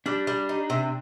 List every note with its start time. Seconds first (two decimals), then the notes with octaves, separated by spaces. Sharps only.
0.06 G3 D4
0.27 G3
0.49 D#4
0.70 C3